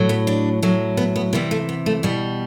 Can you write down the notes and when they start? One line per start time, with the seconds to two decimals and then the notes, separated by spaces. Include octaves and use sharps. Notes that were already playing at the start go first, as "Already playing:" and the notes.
Already playing: A2 F#3
0.09 B3
0.27 D4
0.62 A2 F#3
0.97 B3
1.16 B3
1.33 C3 E3 G3 B3
1.51 A3
1.69 B3
1.86 A3
2.03 B2 G3 B3